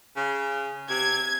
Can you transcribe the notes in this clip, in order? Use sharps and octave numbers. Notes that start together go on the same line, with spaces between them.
C#3
C3 G#6